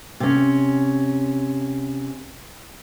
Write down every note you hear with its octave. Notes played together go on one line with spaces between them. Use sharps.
C3 C#4